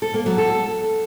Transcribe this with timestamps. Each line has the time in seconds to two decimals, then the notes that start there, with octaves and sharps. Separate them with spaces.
0.02 A4
0.14 A#3
0.26 F#3
0.38 A4